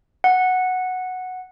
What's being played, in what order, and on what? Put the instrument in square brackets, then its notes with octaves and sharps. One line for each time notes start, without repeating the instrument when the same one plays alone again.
[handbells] F#5